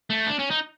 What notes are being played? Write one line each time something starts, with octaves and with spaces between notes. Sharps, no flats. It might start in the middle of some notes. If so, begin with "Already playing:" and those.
A3
D4
C#4
D#4